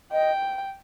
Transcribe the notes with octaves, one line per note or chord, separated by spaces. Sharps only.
D#5 G5